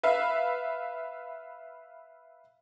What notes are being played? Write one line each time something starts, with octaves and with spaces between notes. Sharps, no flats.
B4 E5 F5